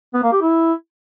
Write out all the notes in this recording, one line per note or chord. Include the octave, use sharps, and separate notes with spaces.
B3
A#3
G4
E4